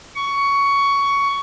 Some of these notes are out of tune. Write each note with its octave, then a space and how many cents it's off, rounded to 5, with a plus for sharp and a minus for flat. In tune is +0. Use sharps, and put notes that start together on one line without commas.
C#6 +15